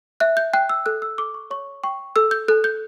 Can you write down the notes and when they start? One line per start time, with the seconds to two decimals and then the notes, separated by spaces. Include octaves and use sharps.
0.20 E5 F#6
0.37 G6
0.53 G5 F#6
0.69 E6
0.86 A4 F#6
1.02 E6
1.18 A4 D6
1.34 C#6
1.51 C#5 C#6
1.84 G5 C#6
2.16 A4 E6
2.31 G6
2.48 A4 F#6
2.64 G6